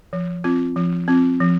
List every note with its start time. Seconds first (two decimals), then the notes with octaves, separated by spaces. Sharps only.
0.13 F3
0.44 C4 F4
0.76 F3
1.08 C4 F4
1.40 F3